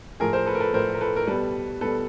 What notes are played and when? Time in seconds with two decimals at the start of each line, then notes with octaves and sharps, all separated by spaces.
0.20 A2 F3 G#4 A#4
0.33 A#4 C5
0.46 A4 B4
0.55 A#4
0.60 A4 B4
0.73 A2 F3 A#4 C5
0.94 A#4
1.01 A4 B4
1.16 A#4
1.27 B2 G3 A4 B4
1.81 B2 G3 A4 B4